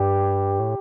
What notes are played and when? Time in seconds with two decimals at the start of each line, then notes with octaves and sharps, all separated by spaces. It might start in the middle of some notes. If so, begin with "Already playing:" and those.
Already playing: G2 G4
0.59 A2